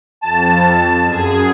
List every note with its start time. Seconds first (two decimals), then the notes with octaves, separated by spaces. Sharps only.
0.23 F2 A5
1.04 F#2 G#4 G#6